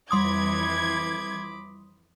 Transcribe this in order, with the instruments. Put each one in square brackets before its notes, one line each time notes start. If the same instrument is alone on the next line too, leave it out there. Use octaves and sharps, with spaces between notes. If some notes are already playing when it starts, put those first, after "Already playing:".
[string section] F2 E3 G#6 [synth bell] G3 C6 D#6 [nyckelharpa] B5 D6